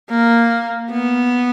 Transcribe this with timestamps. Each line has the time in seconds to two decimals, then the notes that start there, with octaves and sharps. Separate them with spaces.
0.10 A#3
0.91 B3